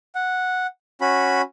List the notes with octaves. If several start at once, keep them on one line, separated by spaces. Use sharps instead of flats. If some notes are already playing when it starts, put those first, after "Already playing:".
F#5
C#4 F#4 B5